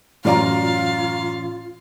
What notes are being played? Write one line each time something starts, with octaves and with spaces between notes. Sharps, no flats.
F#2 A2 E3 C#4 F4 D5 F5 A#5